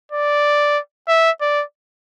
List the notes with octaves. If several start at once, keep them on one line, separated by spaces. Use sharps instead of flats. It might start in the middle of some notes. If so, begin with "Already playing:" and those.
D5
E5
D5